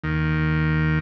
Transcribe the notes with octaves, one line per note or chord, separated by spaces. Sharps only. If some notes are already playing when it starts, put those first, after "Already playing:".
D#2 D#3